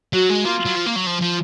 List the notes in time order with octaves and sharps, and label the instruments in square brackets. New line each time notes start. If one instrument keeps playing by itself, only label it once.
[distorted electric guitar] F#3 [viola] F#4
[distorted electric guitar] G#3
[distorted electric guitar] A#3 [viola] F4
[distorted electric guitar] F#3
F3
A#3
F#3
F3
F3